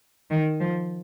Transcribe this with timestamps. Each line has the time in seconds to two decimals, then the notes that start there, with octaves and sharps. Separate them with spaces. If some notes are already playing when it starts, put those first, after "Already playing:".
0.30 D#3
0.60 F3